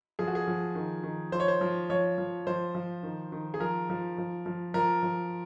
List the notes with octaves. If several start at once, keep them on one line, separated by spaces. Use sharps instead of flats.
F3 G#4
F#4
G#4
F3
D#3
D#3
F3 C5
C#5
C5
F3
F3 C#5
F3
F3 C5
F3
D#3
D#3
G#4
F3 A#4
F3
F3
F3
F3 A#4
F3